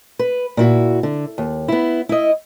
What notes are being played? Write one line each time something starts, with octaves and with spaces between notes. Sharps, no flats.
B4
A#2 E4 F#4
D3
D#2
B3 E4
E4 D#5